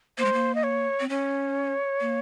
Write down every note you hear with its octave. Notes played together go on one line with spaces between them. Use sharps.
A#3 C5
G#3
A#3
D#5
C#5
C4
C#4 C#5
A#3